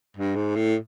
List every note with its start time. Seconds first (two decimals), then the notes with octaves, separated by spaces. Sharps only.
0.17 G2
0.36 G#2
0.56 A2